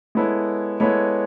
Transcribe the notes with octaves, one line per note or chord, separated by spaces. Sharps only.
G#3 B3 E4 A4 C#5
G#3 B3 E4 A4 C#5